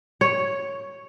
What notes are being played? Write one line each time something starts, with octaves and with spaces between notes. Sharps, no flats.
C#5